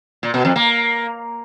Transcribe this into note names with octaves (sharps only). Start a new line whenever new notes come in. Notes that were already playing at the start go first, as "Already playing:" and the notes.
A#2
B2
F2
A#3